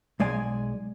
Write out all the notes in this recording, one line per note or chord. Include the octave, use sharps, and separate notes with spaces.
B1 G#3 D5 G#5